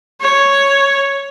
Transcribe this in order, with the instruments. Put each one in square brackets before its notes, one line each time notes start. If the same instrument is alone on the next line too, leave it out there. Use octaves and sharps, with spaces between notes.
[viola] C#5